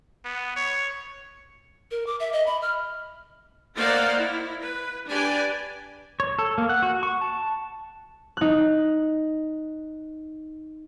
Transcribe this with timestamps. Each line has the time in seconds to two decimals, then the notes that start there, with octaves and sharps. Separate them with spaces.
0.25 B3
0.56 C#5
1.91 A#4
2.07 D6
2.20 E5
2.33 D#5
2.47 B5
2.62 F6
3.76 A#3 C5 D5 D#5 F5 F#5
4.15 E4
4.60 B4
5.09 D4 G4 B4 D5 G#5
6.20 C#5
6.39 A4
6.58 A#3
6.69 F#5
6.83 F#4
7.03 C#6
7.21 A5
8.37 D#4 F#6